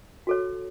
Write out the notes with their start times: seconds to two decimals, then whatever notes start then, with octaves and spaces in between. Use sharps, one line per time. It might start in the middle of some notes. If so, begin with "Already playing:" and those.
0.27 F#4 A4 C#5